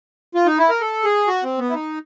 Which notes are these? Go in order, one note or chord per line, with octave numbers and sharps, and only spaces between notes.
F4
D#4
E4
A#4
A4
G#4
F#4
C4
B3
E4
D#4